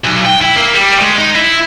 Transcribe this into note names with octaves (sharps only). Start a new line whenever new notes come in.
B1
G5
E4
A#3
G3
G#3
D#4
E4